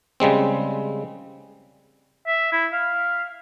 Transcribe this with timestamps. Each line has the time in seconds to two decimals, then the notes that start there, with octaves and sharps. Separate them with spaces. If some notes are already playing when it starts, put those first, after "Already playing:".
0.20 C#3 G3 G#3 C4
2.27 E5
2.53 E4
2.73 F5